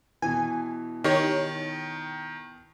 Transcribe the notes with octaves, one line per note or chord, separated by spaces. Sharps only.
B2 E3 G#5
D#3 D#4 G4 C#5